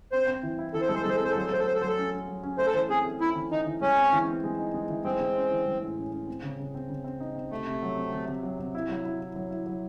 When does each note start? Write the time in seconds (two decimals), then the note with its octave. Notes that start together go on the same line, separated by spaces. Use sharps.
0.12 C4 C5
0.27 C4
0.43 E3
0.59 E4
0.74 E3 A4
0.81 C5
0.88 G#3 A4
0.95 C5
1.03 A4
1.05 G#3 C5
1.17 A4
1.20 C4 C5
1.31 A4
1.35 F#3 C5
1.46 A4
1.51 A3 C5
1.59 A4
1.66 A3 C5
1.75 A4
1.81 F#3 C5
1.89 A4
1.98 C#4
2.13 C#4
2.28 F#3
2.43 C#4
2.58 A3 C5
2.67 A4
2.74 E3 C5
2.89 C4 G#4
3.05 A3
3.21 C4 E4
3.36 E3
3.52 E3 D#4
3.66 E3
3.81 G#3 C#4
3.97 C4
4.12 E3
4.28 C4
4.44 G#3
4.59 D#4
4.74 G#3
4.90 E3
5.04 G#3 C4
5.21 G#3
5.36 C#4
5.51 E3
5.66 G#3
5.82 A2
5.98 C#4
6.12 C#4
6.27 C4
6.43 C#3
6.59 C#3
6.75 C4
6.89 C#3
7.04 C4
7.20 D#4
7.36 C4
7.51 C3 A3
7.67 C3
7.82 F#3
7.97 C4
8.12 C3
8.28 C3
8.43 F#3
8.59 C3
8.75 E4
8.89 F#3
9.05 E4
9.20 E4
9.36 F#3
9.51 E4
9.66 F#3